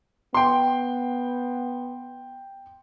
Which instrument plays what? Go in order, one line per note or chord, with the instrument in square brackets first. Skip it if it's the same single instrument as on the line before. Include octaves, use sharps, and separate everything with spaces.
[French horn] B3 [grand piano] G5 C6